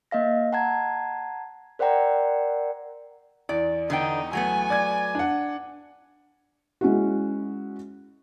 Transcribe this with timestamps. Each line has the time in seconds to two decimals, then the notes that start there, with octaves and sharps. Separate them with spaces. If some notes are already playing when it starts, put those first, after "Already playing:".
0.11 A#3 D#5 F5 A#6
0.53 F#5 A5 A#5 G#6
1.79 A#4 C5 D5 F#5 G5 A#5
3.49 E2 D5
3.90 D3 B3 D#4 G5
4.33 F#3 A3 B3 G#5
4.70 D5 G#6
5.15 D4 F#5
6.81 G#3 C#4 E4 F#4